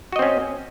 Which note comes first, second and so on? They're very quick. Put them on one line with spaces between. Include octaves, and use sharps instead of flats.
F#4 D#5 C4 C#4